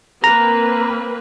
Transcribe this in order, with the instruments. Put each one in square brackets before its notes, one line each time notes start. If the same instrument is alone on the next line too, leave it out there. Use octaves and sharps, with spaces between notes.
[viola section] A#3 C4 B4 [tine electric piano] A#5